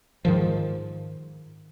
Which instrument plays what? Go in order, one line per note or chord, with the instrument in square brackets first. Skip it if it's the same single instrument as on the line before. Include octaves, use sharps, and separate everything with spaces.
[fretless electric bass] G#2 D#3 F3